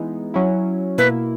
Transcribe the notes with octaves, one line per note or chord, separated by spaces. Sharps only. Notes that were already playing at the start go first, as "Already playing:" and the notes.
Already playing: E3 G#3 B3 D#4
F#3 C#4 E4
B2 A#3 E4 B4